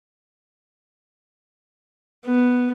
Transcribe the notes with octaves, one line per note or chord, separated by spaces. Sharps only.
B3